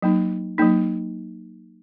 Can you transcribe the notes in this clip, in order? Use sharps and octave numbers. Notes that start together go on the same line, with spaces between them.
F#3 A#3 D#4
F#3 A#3 D#4